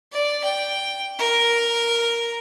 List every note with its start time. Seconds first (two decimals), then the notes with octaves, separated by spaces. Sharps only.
0.12 D5
0.44 G5
1.19 A#4